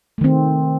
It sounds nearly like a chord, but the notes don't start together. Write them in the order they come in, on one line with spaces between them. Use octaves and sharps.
A3 D#3 C4